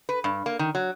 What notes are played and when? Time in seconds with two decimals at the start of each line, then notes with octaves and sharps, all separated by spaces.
0.09 B4
0.24 G2
0.46 A#3
0.59 D#3
0.75 F#3